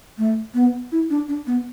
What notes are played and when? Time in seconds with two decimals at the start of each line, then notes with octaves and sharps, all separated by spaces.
0.18 A3
0.54 B3
0.92 E4
1.10 D4
1.29 D4
1.47 B3